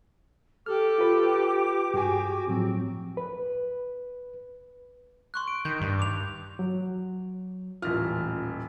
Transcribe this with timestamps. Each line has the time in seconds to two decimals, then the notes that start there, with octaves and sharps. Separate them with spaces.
0.66 G4 A4 D6 F6
0.98 F4 B4
1.94 G2 F#4 G#4 G#5
2.48 A2 F3 F#3 C4
3.17 B4
5.34 C6 C#6 F#6
5.48 D7
5.65 D#3 G6
5.81 G2
5.99 D6 F7
6.59 F#3
7.82 D#1 A1 F4 F6